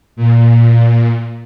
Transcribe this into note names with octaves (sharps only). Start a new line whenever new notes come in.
A#2